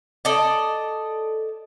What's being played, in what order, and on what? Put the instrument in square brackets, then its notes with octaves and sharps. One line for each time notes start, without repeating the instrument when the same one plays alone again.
[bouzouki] A4 D5 D#5